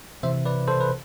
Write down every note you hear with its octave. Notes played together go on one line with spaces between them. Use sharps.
C3 E3 C5 E5
B4 D5
A4 C5
B4